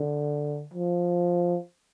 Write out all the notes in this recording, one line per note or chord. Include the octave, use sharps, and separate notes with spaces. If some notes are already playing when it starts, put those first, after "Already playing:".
Already playing: D3
F3